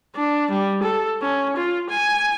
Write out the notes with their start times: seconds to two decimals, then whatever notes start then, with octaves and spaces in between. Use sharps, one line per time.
0.15 D4
0.51 G3
0.83 A4
1.22 C#4
1.56 F4
1.89 G#5